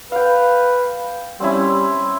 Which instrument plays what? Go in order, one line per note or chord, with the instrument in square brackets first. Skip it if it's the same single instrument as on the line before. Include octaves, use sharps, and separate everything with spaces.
[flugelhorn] B4 [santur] F5 G5
[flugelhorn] G3 [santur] C4 C#4 E4